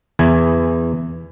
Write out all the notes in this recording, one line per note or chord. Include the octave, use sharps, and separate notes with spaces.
E2 E3 G#5